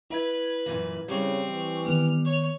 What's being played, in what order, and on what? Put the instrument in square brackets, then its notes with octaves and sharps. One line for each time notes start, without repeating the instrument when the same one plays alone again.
[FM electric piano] E4 E5 G#6 [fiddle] B4
[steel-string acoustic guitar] F#2 A#2 E3
[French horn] C#3 [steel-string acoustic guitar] G3 [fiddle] C4 C#6
[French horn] E3
[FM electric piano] D#3 B3 [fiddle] F6
[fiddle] C#5